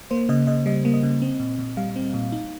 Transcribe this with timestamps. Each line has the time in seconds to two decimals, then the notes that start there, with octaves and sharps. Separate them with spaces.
0.11 A#3 C5
0.29 C#3 D#5
0.47 C#3 D#5
0.66 G3 D#5
0.85 A#3
0.94 D#5
1.03 C#3
1.22 C4
1.40 A#2
1.58 A#2
1.77 G3 F5
1.96 C4
2.14 A#2
2.32 D#4